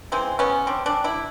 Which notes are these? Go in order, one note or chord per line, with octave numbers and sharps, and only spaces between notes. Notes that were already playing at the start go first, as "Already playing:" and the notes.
C#3 E3 G#3 C4
B3 C#4
C4 D4
C4 D4
D4 E4